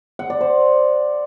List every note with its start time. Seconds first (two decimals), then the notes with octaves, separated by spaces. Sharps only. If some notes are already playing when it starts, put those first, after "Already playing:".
0.19 F#5
0.30 D5
0.41 C5